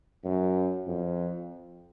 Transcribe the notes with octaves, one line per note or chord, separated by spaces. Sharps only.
F#2
F2